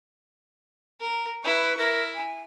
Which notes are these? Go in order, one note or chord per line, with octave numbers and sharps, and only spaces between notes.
A#4
E4 B4 C#6
E4 A#4
G#5